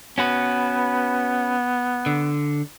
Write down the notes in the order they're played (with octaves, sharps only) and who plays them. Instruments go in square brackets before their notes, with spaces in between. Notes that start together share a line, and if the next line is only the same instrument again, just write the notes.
[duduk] B3 [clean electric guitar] C#4 F#4 B4
[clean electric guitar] D3